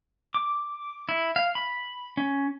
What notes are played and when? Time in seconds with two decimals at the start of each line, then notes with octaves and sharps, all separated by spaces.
0.34 D6
1.09 E4
1.36 F5
1.55 B5
2.17 C#4